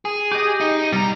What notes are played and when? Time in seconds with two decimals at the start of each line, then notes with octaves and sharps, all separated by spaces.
0.05 G#4
0.32 G4 D#5
0.61 D#4
0.92 B2 G3 A#5